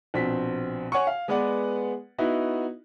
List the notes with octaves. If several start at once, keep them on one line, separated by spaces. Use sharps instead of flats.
A#1 B2 C4 B6
C#5 F#5 G#5 C#6
F5
G#3 B3 B4 D5 F#5
B3 D#4 E4 F#4